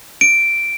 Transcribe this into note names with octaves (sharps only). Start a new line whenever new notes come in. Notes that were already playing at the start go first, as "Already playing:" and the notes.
D7